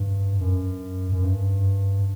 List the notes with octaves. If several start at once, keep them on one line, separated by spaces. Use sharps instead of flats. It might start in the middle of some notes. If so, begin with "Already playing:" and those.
Already playing: G2
F#2
F#2
G2